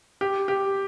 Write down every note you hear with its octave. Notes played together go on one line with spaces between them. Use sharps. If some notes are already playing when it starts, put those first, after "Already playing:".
G4
G4